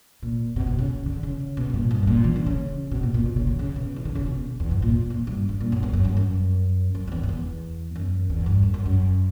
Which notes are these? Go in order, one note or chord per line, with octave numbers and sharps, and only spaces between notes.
A#2
B2
B2
C#3
D3
C#3
B2
G2
A#2
G2
B2
A#2
E3
D3
C#3
B2
A#2
A#2
B2
C#3
D3
C#3
B2
E3
D3
C#3
B2
E2
G2
A#2
A#2
G2
G2
A#2
F#2
E2
F#2
G2
F#2
F#2
F#2
E2
F#2
E2
F#2
E2
G2
F#2
F#2
F#2